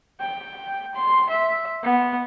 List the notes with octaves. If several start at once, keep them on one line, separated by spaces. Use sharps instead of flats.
G5
C6
E5
B3